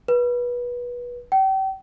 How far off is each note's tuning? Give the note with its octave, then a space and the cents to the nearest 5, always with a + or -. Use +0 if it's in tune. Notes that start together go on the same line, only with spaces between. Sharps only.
B4 -25
G5 -35